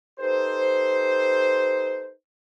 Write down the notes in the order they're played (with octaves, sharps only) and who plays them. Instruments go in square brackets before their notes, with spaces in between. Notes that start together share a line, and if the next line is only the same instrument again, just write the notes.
[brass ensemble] D#4 G4 A4 B4 C5